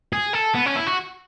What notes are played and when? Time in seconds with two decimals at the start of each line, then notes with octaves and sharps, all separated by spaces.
0.13 G#4
0.33 A4
0.54 B3
0.66 C#4
0.76 E4
0.87 F#4